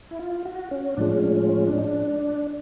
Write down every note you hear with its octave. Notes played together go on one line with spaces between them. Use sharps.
E4
F4
F#4
C#4
A2 F3 G#3 D4
C#4
C#4
C#4
C#4
D4
D#4
D4